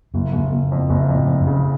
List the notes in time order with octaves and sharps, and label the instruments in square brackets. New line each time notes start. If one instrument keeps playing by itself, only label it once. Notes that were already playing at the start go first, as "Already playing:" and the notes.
[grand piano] F#1 [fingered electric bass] F#2
[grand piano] F#1 [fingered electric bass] G#2
[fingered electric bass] F#2
[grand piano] F#1
F2
[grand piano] F#1 [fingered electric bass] F#2
[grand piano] F2
[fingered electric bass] A2
[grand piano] F2
[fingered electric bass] F#2
[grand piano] C#3